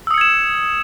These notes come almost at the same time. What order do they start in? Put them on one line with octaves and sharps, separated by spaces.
E6 D#6 C#7 G#6 E7